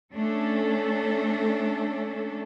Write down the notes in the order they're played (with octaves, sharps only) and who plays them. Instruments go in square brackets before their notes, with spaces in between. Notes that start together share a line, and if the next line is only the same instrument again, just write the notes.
[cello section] A3 C#4 D4 A4